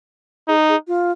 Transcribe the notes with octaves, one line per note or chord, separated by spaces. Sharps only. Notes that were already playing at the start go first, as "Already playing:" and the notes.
D#4 G#4
G#4
F4